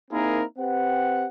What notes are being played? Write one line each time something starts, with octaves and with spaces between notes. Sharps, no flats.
A#3 C4 D#4 E4 G#4 A#4
C4 G4 B4 F#5